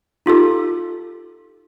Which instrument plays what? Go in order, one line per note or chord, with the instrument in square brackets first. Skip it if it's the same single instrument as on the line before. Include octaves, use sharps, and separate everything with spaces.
[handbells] D#4 F4 G4 A4